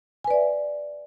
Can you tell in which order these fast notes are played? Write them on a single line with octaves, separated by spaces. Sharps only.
G#5 B4 D5 E5